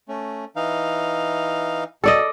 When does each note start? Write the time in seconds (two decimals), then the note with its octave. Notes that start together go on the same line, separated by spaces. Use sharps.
0.08 A3 C#4
0.56 E3 D#4 F5
2.04 B2 F#4 A4 D5 D#5